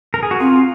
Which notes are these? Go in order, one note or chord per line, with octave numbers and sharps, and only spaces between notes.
A#4
G#4
F#4
C4 F4